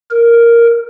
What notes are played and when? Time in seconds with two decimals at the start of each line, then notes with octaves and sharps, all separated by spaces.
0.11 A#4